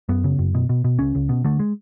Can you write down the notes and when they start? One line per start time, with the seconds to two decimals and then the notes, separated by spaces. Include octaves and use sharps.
0.09 F#2 B3
0.24 C#3
0.39 F#2
0.55 B2
0.69 B2
0.84 B2
0.99 C#2 C#4
1.15 C#2
1.29 B2
1.45 D3 A3
1.59 G#3